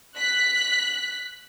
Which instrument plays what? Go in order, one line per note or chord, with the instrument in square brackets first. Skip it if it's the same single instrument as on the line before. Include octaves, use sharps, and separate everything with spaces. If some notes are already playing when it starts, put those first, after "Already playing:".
[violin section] F#6 B6